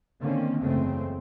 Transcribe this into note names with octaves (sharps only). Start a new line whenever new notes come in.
D3 D#3 A#3 C4 C#4
F#1 E2 C#3 G#3 A3 C4